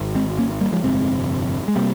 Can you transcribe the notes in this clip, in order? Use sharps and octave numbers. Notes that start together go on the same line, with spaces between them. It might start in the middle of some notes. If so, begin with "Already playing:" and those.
Already playing: G#1
G#3 C4
A#3 C#4
G3 A#3
F3 G#3
G1 F2 C3 G#3 C4
G#3
C3 G3 A#3